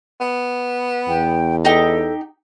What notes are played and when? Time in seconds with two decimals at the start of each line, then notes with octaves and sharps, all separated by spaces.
0.21 B3
1.08 E2 G5
1.65 D#4 G4 A4 G5